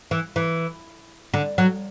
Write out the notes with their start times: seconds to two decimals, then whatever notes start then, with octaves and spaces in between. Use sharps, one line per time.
0.11 E3
0.36 E3
1.34 D3
1.58 F#3